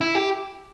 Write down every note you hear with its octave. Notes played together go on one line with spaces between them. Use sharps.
E4
G4